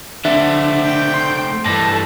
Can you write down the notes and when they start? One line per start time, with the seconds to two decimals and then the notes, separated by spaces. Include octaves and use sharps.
0.25 D3 A3 C4 E5 A6
0.83 G5
1.14 C6
1.66 G2 E3 A4 A#6